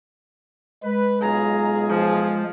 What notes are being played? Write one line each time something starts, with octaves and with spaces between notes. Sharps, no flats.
G#3 B4
B1 F4 G#4 A#5
F3